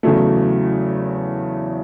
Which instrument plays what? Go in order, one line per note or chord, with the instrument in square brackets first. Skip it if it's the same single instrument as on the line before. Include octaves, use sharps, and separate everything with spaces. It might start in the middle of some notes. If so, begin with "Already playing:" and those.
[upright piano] E2 C#3 F#3 A3